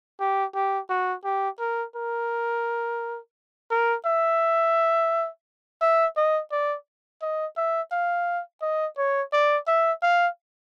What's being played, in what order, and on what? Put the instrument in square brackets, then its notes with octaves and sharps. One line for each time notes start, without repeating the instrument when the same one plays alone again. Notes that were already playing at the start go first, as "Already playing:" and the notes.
[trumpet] G4
G4
F#4
G4
A#4
A#4
A#4
E5
E5
D#5
D5
D#5
E5
F5
D#5
C#5
D5
E5
F5